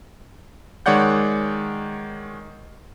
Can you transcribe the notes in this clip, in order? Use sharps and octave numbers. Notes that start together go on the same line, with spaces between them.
D#3 G#3 C#5 D5 F#5 G6